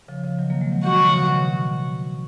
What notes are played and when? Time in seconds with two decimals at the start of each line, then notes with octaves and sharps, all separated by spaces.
0.08 C#3 F3
0.24 C#3 F3
0.39 D#3 F#3
0.50 F#3 A#3
0.61 F3 G#3
0.73 D#3 F#3
0.84 D#3 F#3 F#4
1.00 C#3 F3
1.15 B2 D#3
1.29 C#3